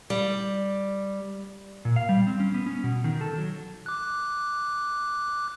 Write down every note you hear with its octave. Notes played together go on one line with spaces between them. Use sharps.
G3
A#2
F5
G3
C4
C#4
B3
C#4
B2
D#3
A4
F#3
D6 F#6